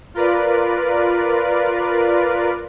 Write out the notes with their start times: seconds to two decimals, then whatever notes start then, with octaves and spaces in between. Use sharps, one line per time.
0.14 F4 A#4 B4 D5